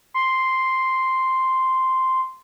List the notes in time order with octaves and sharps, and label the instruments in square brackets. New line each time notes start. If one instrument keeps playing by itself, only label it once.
[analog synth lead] C6